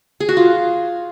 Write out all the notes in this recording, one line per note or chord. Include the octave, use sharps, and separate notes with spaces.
G#4
F#4
F4